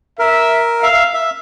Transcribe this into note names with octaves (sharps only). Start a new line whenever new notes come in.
A#4 E5
E5 F5
E5
E5